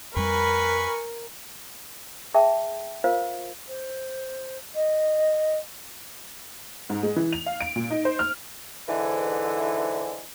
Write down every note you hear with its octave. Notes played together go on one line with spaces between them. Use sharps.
F2 G3 A#4 B4 G#5 B5 C#6
G#4 E5 G5 A5
F4 A#4 C5 F5
C5
D#5
G#2
G#3
E3
F7
F5
D7
A#2
D#4
C5
F6
G#2 D3 E3